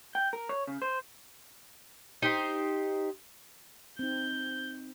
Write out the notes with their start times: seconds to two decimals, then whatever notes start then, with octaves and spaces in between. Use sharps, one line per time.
0.15 G5
0.33 A#4
0.49 C#5
0.67 C#3
0.82 C5
2.22 D#4 G4 C5
3.99 C4 D#4 G6